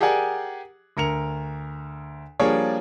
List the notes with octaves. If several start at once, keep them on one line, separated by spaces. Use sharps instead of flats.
G4 G#4 A#4 D5 F#5 G#5
D2 A#4 C#7 F7
F3 G3 A#3 D4 G#4 C#5